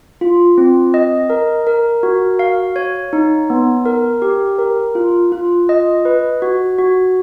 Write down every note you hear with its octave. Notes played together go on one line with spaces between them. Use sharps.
F4
C4
D#5
A#4
A#4
F#4
F5
C#5
D#4
B3
A#4
G4
A#4
F4
F4
D#5
B4
F#4
F#4